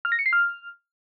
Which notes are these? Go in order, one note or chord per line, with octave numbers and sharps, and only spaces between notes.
F6
A#6
C#7
C7
F6